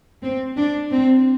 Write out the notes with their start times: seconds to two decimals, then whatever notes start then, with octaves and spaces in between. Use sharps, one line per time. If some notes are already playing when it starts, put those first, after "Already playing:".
0.23 C4
0.57 D4
0.91 C4